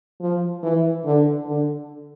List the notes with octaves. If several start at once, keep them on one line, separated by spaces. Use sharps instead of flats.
F3
E3
D3
D3